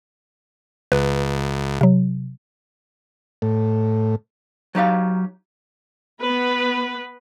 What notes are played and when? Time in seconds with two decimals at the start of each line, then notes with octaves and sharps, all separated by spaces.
0.92 C#2 B4
1.81 C3 F#3
3.42 A2
4.75 F#3 D#4 G4 F5
6.23 B3 B4